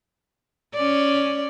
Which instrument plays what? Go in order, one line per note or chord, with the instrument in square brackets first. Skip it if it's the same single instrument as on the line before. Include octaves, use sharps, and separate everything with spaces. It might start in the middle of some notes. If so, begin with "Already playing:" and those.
[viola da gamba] C#4 D5